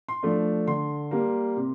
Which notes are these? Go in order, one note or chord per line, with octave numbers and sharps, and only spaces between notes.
C6
F3 A3 D4
D3 C6
G3 A#3
C3